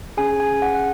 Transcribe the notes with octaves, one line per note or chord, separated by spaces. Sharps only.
C#4 G#4 G#5
G#5
F#5
F#5